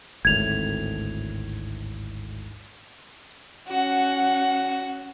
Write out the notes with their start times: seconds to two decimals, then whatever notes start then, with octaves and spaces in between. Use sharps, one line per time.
0.25 G#1 D2 A2 G#6 F7
3.69 C#4 F#4 F#5